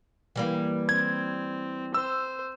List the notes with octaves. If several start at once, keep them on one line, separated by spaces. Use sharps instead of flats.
E3 G3 A#3
C4 G#6
C5 E6